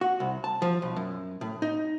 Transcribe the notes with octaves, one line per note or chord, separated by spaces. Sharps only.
F#4
C2
A5
F3
B1
F#2
A2
D#4